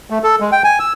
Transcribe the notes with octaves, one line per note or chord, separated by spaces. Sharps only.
A3
A4
G#3
G5
G#5
E6